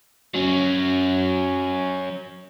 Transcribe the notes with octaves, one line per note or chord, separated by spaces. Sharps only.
F#3 C#4